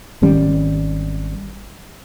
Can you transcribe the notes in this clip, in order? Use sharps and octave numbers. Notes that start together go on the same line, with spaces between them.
G#1 D#3 G3 C#4